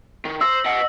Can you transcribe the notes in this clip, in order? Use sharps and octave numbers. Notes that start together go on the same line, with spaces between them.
D#3
C5 E6 A#6
D#5 F#5